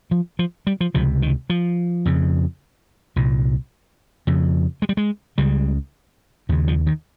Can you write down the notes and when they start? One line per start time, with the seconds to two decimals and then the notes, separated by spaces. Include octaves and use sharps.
0.11 F3
0.39 F3
0.67 G3
0.81 F3
0.94 C#2 C3 F3
1.22 D#3
1.50 F3
2.06 F2 C#3
3.16 C2 A#2
4.27 F2 C#3
4.82 G#3
4.89 G3
4.97 G#3
5.38 C#2 C#3 G3
6.49 D#2 D#3
6.52 C#3
6.68 F3
6.86 D#3